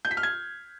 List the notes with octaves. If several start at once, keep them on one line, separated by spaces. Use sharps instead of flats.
G6
B6
F6
G#6